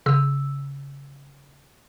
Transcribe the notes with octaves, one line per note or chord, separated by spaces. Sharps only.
C#3 E6